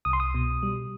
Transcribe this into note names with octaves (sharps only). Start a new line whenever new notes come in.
C2 D#6
C6
D#6
B2
G3